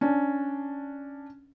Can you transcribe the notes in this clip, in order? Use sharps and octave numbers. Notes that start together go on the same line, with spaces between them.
C#4 D4